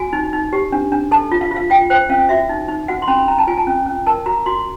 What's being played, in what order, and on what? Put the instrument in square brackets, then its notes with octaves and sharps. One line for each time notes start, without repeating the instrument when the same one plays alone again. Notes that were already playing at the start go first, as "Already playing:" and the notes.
Already playing: [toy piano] F#4 G#5
D#4
D#4
G4
D4
D4
A4 A5
F4
F5
F4
F5
F4 G5
C5 G5
C#4 F5
F#4 E5
D#4
D#4
F#4 F#5
C6
C#4 B5
C#4 A#5
A5
F4 G#5
A5
C#4
C#4
A#4 A5
F#4 A#5
F#4 C6